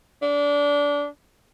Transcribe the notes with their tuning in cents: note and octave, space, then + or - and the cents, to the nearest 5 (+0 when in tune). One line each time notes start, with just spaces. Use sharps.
D4 -25